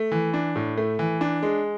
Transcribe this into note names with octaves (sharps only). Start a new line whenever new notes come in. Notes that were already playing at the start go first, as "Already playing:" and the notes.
Already playing: A3
E3
D4
A2
A3
E3
D4
G#3